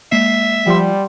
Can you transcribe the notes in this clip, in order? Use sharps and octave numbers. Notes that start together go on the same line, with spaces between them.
G#3 A#3 E5 C7
F3 G3 F#5 C6